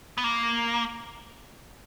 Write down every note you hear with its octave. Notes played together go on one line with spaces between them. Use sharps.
B3
A#3